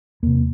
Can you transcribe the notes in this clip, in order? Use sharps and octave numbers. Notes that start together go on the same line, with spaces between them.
E2 C3 A#3